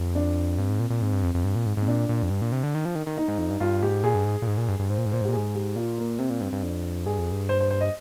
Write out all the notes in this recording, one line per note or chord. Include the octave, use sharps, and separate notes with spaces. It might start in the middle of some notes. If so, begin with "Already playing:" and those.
Already playing: F2
D4
G2 C4
G#2
A#2
A#2
G#2 C4
G2
F2
F2
G2
A#2
G#2
G#2 C4
A#2 D4
A#2
F2
G2
A#2
C3
D3
D#3
F3
D#3
D#3
D#4
G#2
F2
G2
G2 F4
G#2 G4
A#2 G#4
G2
G#2
A#2
G#2
A#2
G2
G2
G#2 C5
A#2
G#2
A#2 C5
G#2
G4
A#2
G#2 G#4
G4
A#2 F4
A#3
C3 C4
A#2
G2 C4
G2
F2 D4
G2 G#4
F2
G2
C5
C5
C5
D#5